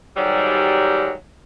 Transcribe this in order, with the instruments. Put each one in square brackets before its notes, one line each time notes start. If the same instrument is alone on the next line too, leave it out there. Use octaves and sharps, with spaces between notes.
[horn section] G#2 D#3 F#3 G3